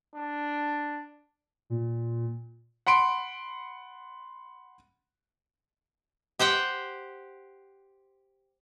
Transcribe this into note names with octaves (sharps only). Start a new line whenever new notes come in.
D4
A#2
F#5 B5 C6 D7
G4 C5 F#5 G5